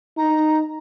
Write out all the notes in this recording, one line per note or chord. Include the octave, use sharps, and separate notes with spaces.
D#4 A#5